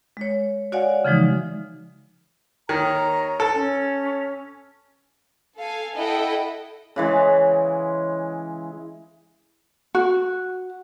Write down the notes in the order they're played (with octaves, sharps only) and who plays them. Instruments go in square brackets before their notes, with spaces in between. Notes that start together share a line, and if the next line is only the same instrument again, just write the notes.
[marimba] G#3 C#5
F#4 C#5 D5 F5 F#5 G#5
C#3 E3 F3 G#3 D#4
[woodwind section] D#2 C#5 A#5 [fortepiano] D#3
[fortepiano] A4
[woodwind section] C#4
[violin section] A4 F5 G#5
E4 A4 D#5 F#5 G5
[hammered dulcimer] C#3 E3 G#3
[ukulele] F#4